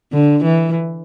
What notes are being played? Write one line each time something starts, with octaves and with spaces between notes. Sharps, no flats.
D3
E3